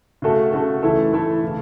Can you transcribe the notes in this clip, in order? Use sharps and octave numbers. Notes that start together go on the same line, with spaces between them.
C#3 A3 F#4 A4
C#3 A3 F#4 A4
E3 A3 E4 A4
E3 A3 E4 A4
C#3 E3